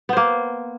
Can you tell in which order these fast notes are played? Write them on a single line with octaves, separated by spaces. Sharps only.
B3 C5 A#3